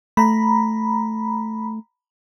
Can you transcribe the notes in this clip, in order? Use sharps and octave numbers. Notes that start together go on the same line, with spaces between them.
A3 A#5 B5